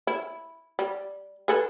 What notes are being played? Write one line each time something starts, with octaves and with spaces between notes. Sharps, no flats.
E4
G3
G#4 A4 B4